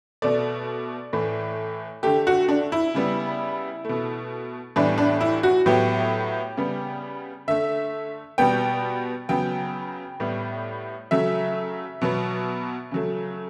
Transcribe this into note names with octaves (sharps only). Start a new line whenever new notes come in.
B2 A3 D5
A2 E3 A3
D3 A3 G4
F#4
D4
E4
C#3 G3 B3
B2 A3
A2 E3 G3 B3 D4
D4
E4
F#4
A2 F#3 B3 G4
C#3 G3 B3
D3 A3 E5
B2 G3 B3 G5
C#3 F#3 B3 G5
A2 G3 B3
C#3 F#3 A3 E5
B2 F#3 B3
C#3 F#3 A3